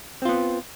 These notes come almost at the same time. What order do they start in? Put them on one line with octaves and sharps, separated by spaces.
C4 F4 B3